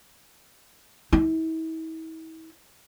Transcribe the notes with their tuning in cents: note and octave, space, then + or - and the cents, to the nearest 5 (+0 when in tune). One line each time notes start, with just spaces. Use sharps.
E4 -40